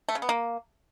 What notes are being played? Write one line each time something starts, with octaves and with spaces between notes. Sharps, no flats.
A3
C#3
B3
A#3